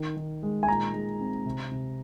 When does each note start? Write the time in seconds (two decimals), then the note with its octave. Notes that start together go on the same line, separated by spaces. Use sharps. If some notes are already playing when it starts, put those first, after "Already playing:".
Already playing: D#3
0.16 D#3
0.43 G#3
0.63 G#5
0.68 A#2 A#5
0.94 G#3
1.20 C4
1.45 C3
1.71 C3